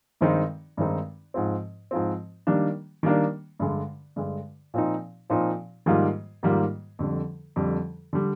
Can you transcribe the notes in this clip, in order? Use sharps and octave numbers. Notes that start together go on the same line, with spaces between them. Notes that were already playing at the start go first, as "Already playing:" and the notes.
G2 D#3 G#3 C4 D#4
G2 D#3 G#3 C4 D#4
G#2 F3 C4
G#2 F3 C4
D#3 G3 A#3 D4
D#3 G3 A#3 D4
G2 D3 G#3
G2 D3 G#3
A#2 F3 C4 D#4
A#2 F3 C4 D#4
G#2 D#3 G3 A#3 F4
G#2 D#3 G3 A#3 F4
F2 D3 G3
F2 D3 G3
D3 G3